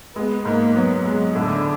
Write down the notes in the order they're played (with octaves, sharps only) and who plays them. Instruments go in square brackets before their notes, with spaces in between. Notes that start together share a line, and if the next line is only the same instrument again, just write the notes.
[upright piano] G#3 [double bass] B3
[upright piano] G#2 [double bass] A#3
[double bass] F#3 [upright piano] B3
[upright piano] G#3
[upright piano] A2 [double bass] D3